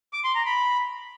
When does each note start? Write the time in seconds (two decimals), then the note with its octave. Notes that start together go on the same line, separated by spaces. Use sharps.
0.13 D6
0.24 C6
0.35 A#5
0.46 B5